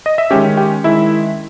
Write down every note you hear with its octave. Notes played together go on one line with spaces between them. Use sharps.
D#5
E5
D#3 G#3 C#4 G4 G5
G4 G5
D#3 G#3 C#4 E4 E5